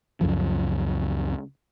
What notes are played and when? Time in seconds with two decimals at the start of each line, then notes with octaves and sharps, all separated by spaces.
0.21 C#2 F#2 F3